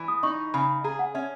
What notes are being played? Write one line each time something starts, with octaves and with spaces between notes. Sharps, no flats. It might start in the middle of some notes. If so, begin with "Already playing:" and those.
Already playing: E3
D#6
D#4 C#6
C#3 B5
G#4 A#5
F#5
C#4 E5